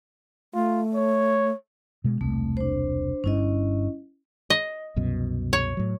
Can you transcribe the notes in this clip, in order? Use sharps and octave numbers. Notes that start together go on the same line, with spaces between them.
A3 F4
C#5
B2 G#3
E1 C2 A3 C4
D4 C5
G1 G2 C#4 E4 D#5
D#5
C2 F#2 B2
C#5
A2 F#3